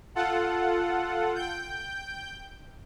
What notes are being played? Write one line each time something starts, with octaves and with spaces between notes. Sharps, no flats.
F4 A4 F#5
G5 G6